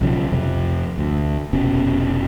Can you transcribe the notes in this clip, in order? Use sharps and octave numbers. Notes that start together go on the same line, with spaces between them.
B1 C#3 F3
F2 C3
D2
F1 B2 C#4